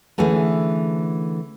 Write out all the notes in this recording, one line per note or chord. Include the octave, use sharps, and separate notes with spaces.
D3 E3 A3 C#4 G#4